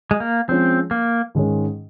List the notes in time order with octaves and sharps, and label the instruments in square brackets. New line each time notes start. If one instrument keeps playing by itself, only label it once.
[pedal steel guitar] G#3
A#3
[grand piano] F3 G#3 C#4 F4 [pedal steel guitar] C4
[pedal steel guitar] A#3
[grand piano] G#2 D#3 G#3 C#4